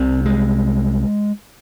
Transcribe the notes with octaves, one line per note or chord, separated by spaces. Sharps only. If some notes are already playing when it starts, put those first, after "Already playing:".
Already playing: C2 C3 C4
G#3